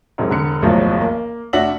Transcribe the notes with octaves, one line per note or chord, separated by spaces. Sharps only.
E1 G#2 C3 F#3
E1 D3 C#7
F#1 B1 E2 A2 F3 F#3
A#3
F1 A3 D4 F#4 E5 F#7